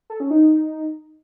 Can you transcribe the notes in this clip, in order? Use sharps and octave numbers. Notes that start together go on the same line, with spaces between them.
A4
C#4
D#4